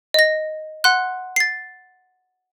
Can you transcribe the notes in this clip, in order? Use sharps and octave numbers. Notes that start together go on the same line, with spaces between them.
D#5 A#6
F#5 C6 F#6
A6 C7